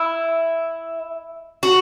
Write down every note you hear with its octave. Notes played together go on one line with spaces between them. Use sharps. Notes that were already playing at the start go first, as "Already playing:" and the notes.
Already playing: E4
F#4